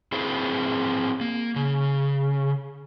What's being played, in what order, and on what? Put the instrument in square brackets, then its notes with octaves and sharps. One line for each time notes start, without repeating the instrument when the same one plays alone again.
[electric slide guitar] C4 E4 G#4 B4 C5 F5
A#3
C#3